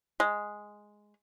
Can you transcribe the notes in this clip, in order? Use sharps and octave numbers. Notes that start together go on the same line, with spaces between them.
G#3